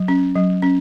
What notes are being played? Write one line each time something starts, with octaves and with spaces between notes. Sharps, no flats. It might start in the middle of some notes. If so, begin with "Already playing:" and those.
Already playing: F#3
C#4
F#3
C#4